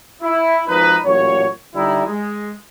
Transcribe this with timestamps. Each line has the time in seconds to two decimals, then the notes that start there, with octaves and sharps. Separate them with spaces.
0.22 E4
0.67 G#1 F3 D#4 B4
1.05 A1 A#2 F#3 C#5
1.75 D3 G3 D#4 E4
2.05 G#3